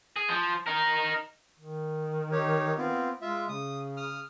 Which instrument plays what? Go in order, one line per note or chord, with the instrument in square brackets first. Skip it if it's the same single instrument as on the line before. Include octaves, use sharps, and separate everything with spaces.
[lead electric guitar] G#4
F3
D#4 A#4
[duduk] D#3
[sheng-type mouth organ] D#4 G4 C#5
B3 C4 F4
[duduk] G#3 [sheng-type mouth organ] F4 E5
[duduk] C#3 [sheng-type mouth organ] D#6
[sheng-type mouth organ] D#6 F6